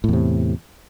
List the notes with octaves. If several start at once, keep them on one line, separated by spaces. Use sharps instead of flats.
E2 A2 C3